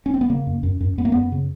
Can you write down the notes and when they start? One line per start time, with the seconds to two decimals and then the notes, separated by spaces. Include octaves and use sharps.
0.06 C#4
0.14 C4
0.21 B3
0.30 C#3 A#3
0.47 F#2
0.63 F#2
0.81 F#2
0.98 F#2 B3
1.05 A#3
1.12 F#2 B3
1.32 C#3